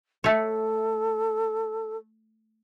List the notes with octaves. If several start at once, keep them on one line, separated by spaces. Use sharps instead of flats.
A3 A4 C#5